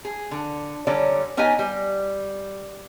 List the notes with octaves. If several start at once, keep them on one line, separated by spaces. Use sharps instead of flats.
G#4
D3
D3 F#3 G3 C#4 D5
B3 C#4 D#4 G4 D#5 G#5
G3